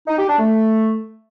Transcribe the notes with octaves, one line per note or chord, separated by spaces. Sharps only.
D#4
G4
D4
A3